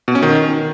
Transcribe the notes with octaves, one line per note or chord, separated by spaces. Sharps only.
B2
C#4
D#3